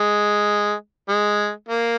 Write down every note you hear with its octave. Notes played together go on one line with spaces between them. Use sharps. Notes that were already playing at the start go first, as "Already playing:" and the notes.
Already playing: G#3
G#3
A#3